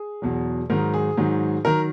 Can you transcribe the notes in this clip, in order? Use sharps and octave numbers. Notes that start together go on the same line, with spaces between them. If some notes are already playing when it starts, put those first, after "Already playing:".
Already playing: G#4
E2 B2 F#3
G#2 D#3 F#3 A#4
G#4
G#2 D#3 F#3
D#3 F#3 A#4